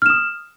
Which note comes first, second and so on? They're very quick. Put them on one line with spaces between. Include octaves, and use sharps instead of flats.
F6 E7 D#6